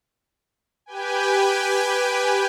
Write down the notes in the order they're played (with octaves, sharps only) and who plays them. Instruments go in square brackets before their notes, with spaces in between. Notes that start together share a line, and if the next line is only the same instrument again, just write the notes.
[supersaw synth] G4 B4 G5 G#5